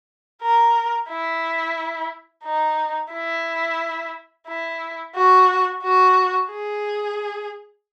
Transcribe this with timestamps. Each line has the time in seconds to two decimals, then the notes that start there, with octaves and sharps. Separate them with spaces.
0.42 A#4
1.09 E4
2.45 D#4
3.12 E4
4.48 E4
5.15 F#4
5.83 F#4
6.50 G#4